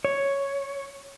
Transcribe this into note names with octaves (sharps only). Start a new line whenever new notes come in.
C#5